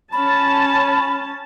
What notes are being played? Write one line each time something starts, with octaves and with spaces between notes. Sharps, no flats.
C#4 A5 B5